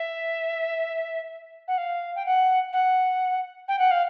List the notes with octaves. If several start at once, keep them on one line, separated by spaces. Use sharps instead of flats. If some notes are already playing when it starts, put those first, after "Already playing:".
Already playing: E5
F#5
F5
G5
F#5
F#5
G5
F#5
F5